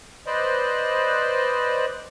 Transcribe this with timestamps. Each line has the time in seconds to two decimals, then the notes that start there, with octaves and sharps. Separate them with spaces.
0.27 B4 C5 D5 D#5